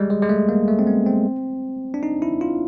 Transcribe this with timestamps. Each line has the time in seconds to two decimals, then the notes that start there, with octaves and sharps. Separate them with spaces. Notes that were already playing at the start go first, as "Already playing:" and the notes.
Already playing: G3 G#3
0.10 G#3
0.22 G#3
0.29 A3
0.49 A#3
0.68 A3
0.79 C4
0.87 B3
1.06 C4
1.94 D4
2.03 D#4
2.22 E4
2.41 F4